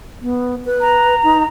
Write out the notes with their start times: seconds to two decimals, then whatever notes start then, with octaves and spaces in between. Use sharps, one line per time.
0.22 B3
0.65 B4
0.81 A#5
1.23 D#4